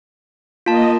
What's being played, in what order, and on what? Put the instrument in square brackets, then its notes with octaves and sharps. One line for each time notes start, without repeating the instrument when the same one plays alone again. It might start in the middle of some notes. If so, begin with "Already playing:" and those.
[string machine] A#3 D#5 [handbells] F4 A5